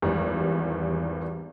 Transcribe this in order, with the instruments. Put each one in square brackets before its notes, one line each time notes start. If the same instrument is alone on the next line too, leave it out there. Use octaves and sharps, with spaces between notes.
[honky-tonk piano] G#1 E2 E3 G3